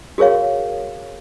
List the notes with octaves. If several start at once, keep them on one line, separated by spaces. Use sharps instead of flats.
F#4 G#4 A#4 C#5 F5